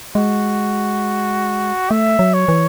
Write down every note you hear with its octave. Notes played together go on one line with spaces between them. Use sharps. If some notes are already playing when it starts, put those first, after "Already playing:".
G#3 F#4
A3 E5
F#3
C#5
E3